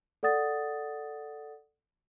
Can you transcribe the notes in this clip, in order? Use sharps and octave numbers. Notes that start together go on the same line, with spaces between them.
A4 D5 F#5 D#6 A6